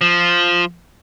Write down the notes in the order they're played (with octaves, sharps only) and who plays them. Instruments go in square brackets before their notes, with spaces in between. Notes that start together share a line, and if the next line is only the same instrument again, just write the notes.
[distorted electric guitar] F3